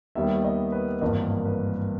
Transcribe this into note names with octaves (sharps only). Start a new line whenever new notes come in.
D#2 D#3 G3 B3 E5
D#5
B4
G#1 G2 E3 A#3 D#5
B4